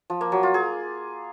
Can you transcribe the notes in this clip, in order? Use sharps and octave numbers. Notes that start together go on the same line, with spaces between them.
F3
A#3
F#3
F4
G#4